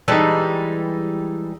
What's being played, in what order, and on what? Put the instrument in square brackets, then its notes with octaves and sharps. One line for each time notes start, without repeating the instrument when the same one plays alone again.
[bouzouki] E3 G3 G#3 [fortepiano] D#4 A4